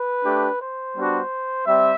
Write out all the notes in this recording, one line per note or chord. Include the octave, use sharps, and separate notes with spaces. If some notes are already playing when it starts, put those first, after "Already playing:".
Already playing: B4
A3 D4 G4
C5
G3 B3 D4 F#4
G3 C4 E5